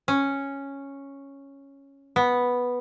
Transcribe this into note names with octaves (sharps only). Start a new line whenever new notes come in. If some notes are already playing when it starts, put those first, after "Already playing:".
C#4
B3